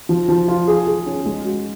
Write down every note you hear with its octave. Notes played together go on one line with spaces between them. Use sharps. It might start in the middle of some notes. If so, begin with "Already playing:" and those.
F3
F3
F4
G#4
G#4
C#4
G#3
F#4